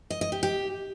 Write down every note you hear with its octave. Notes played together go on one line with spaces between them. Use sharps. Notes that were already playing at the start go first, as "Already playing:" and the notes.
D#5
D#5
G4
G4